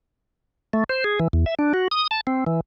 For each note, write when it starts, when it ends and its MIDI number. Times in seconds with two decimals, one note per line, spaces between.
0.73 0.84 57
0.89 1.04 72
1.04 1.19 68
1.19 1.28 52
1.33 1.45 40
1.46 1.55 76
1.59 1.73 62
1.74 1.88 66
1.91 2.07 87
2.11 2.21 81
2.27 2.44 60
2.46 2.60 52